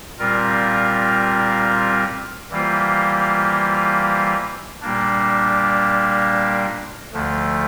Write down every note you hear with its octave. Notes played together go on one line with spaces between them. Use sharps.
A#2 G3 C4 F4 A#4
E3 G3 A#3 F4 C5
A#2 G3 A#3 D4
D2 D3 F3 A3